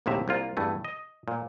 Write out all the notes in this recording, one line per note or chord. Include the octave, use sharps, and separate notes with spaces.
A#1 D#2 A2 C3 E5 A#5
C2 A#3 F4
E2 G2 A3 G#5
D#5
A#2